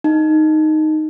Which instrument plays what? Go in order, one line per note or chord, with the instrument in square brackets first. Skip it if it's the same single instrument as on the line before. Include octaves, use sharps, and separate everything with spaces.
[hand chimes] D#4